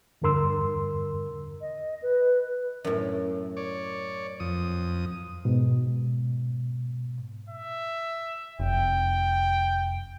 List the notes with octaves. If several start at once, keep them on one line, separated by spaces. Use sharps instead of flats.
E2 G2 D3 A#4 C6 E6
D#5
B4
F#2 A2
C#5 D5
F2 D#6
G#2 B2
E5
F1 G5